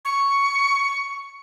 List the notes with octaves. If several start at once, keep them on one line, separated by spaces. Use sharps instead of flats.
C#6